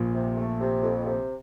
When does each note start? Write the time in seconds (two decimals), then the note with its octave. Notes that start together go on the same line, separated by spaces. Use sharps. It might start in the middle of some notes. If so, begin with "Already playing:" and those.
Already playing: A#1 A#2
0.14 C3
0.37 A3
0.60 C3
0.82 F2
1.05 C3